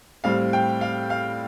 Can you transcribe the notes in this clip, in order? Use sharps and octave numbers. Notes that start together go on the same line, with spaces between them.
A2 G3 C4 F5
G5
F5
F5